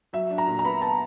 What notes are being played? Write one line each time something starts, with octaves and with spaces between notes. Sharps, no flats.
F#3 E5
D4
A#5
A#2
A#5
B3 B5
B3 A5